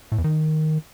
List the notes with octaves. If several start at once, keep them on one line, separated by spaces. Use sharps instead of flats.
A2
E2
D#3